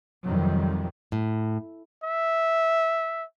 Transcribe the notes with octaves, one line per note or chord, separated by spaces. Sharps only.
F2 C3 D#3 F#3 G3
A2
E5